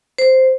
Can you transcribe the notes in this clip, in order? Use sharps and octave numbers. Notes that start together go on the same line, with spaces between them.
C5